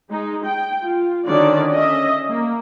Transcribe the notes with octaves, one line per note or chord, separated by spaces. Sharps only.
G#3 D#4
G5
F4
D3 D#3 C#4 F#4 D5
C#4 D#5 E5
A#3